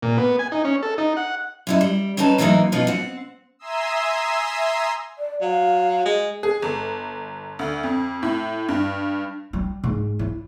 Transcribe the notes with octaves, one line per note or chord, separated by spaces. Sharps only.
A#2
B3
G#5
D#4
C#4
A4
D#4
F#5
F#2 E4 D#5
G3
C4 C#4 D#4 B4 A5
E3 F#3 A#3 C4 D#4
B2 F3 B3 D#4 F4
C4 F#5
E5 G#5 A#5 C6 D#6 E6
D5
F#3 F5
G#3
G#4
G1
D2
F2
A2
G2
G3
G#2
E4